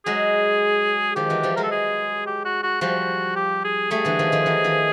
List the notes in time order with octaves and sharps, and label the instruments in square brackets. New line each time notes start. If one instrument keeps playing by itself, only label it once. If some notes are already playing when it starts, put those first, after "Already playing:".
[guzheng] F#3 G#3 [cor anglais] G#4
[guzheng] D#3 F3 [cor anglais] G4
[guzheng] E3 F#3
F3 G3
[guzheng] F#3 G#3 [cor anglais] A#4
[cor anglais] A4
G#4
G4
F#4
F#4
[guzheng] F3 G3 [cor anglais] F#4
[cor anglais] G4
G#4
[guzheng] G3 A3 [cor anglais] G#4
[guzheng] D3 E3
D#3 F3
D#3 F3
E3 F#3
D#3 F3